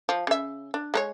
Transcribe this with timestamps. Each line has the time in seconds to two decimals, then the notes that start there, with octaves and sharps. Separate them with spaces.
0.09 F3
0.27 C#3 E5
0.74 D4
0.94 G#3 A4 C#5